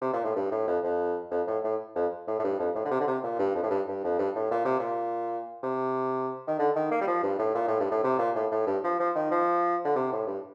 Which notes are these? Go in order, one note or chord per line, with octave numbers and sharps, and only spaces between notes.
C3
A#2
A2
G2
A2
F2
F2
F2
A2
A2
F2
A2
A2
G2
F2
A2
D3
C3
D3
C3
A#2
G2
F2
A2
G2
G2
F2
G2
A2
A#2
C3
A#2
C3
D#3
D3
D#3
A#3
G3
F3
G2
A2
A#2
A2
G2
A2
C3
A#2
A2
A2
G2
F3
F3
D#3
F3
D3
C3
A2
G2